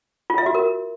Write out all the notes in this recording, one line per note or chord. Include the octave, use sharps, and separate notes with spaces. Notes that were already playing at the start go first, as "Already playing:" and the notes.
F4
E5
F#4
A#4